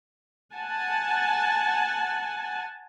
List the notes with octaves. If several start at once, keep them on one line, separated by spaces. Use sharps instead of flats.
F#5 G#5 A5